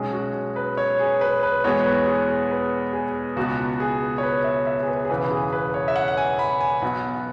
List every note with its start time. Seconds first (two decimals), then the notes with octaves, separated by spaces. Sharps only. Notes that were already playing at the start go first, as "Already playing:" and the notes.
Already playing: B1 B2 G#3 C#4 G#4
0.13 F#4
0.56 B4
0.77 C#5
0.99 G#4
1.21 B4
1.43 B4
1.64 E2 B2 G#3 B3 C#5
1.85 B4
2.07 G#4
2.28 G#4
2.51 B4
2.93 G#4
3.36 C#2 B2 B3 F#4
3.80 G#4
4.18 C#5
4.23 B4
4.44 E5
4.67 E5
4.83 G#4
4.88 B4
5.05 G#4
5.10 E1 E2 C#3 E3 B4
5.31 G#4
5.53 B4
5.74 C#5
5.88 E5
5.96 F#5
6.08 F#5
6.18 G#5
6.39 B5
6.61 G#5
6.82 B1 B2 B3 F#5